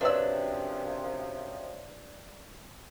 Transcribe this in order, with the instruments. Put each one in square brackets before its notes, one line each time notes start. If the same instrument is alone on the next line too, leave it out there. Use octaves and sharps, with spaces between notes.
[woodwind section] F#2 C3 F3 [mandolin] D4 E6 [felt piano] B4 C#5 D5